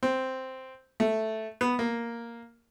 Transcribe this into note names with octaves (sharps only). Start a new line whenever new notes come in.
C4
A3
B3
A#3